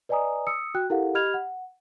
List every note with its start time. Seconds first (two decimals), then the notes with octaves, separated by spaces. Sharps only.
0.09 B4 D5 D#5 G#5 A#5 D#6
0.47 D#6 E6 C#7
0.75 F#4 G5 F#6
0.90 E4 G4 A4 A#4 F5 F#5
1.14 G4 D#5 B5 F6 G#6 F7
1.34 F#5